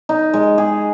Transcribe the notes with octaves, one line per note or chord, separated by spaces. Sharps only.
D#4
G#3
G#4